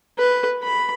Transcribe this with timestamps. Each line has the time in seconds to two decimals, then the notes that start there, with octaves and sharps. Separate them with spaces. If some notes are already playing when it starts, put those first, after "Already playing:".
0.19 B4
0.63 B5